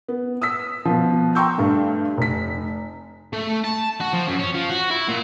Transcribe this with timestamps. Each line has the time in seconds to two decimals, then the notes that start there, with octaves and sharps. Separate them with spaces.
0.08 B3
0.42 D#6 E6 B6
0.85 B2 F3
1.35 G5 A#5 C6 C#6 E6 G6
1.58 G2 A3
2.17 F1 B6
3.33 A3
3.64 A5
4.00 F#4
4.13 F3
4.28 F#2
4.39 C#4
4.54 F3
4.70 F#4
4.91 E4
5.08 A#2